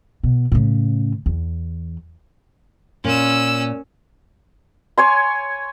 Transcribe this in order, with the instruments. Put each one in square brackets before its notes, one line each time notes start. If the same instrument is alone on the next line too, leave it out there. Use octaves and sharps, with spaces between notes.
[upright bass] B2
A2 C#3
E2
[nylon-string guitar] A#2 [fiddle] C#4 E6
[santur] C#5 G#5 C6